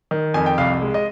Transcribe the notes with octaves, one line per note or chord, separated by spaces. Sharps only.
D#3
F2 G#5
G5
C2 F5
G#3
D#5